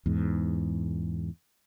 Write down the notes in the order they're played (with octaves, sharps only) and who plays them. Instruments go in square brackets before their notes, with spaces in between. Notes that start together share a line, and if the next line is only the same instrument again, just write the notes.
[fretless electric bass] E2 G#2